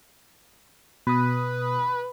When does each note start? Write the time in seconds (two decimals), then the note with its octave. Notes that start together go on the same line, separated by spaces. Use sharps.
1.07 B2 B4 D#6